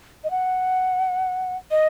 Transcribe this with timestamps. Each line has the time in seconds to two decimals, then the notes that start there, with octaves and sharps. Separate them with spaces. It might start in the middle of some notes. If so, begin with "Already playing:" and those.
0.24 D#5
0.31 F#5
1.71 D#5